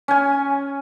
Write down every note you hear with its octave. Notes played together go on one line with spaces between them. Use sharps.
C#4 G#5